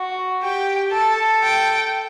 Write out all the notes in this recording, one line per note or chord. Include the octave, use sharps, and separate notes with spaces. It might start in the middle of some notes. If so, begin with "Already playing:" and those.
Already playing: F#4
G4 G5
A4 A5
G5